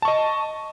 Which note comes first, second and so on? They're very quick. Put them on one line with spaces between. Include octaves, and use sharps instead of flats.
A5 C#6 D#5